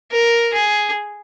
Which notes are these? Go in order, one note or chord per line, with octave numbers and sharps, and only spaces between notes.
A#4
G#4